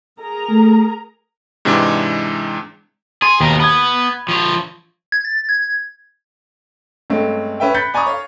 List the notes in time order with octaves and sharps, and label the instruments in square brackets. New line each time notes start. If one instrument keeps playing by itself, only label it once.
[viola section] G#4 A#4 A#5
[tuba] A3
[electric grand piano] G#2 C3 E3 G#3 D4
[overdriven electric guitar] G#4 [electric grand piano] C6
[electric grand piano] D#2 [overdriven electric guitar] B2 A#4
[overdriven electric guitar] B3 [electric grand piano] B5 G#6
[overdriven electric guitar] F3 C#5
[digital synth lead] G#6
A6
G#6
[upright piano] G2 G#3 A3 C4 C#4
C#4 B4 E5 G5
B5 F#6 G6 A6 B6 C#7
D5 G#5 A#5 B5 C#6 D#6
C#5 F5